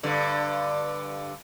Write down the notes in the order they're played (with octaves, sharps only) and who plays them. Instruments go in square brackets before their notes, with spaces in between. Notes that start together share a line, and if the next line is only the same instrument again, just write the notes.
[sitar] G2 D3